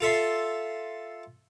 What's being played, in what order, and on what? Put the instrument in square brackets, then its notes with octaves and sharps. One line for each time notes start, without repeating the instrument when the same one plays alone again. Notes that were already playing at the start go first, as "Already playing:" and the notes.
[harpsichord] F4 A4 E5 C6